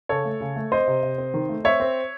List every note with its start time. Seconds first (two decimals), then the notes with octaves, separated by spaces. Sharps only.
0.09 C#3 A4 C#5
0.25 A3
0.41 C#3
0.56 A3
0.72 C4 C5 D#5
0.87 C3
1.03 C3
1.18 C4
1.34 D#3
1.49 A3
1.64 C4 C#5 E5
1.80 C4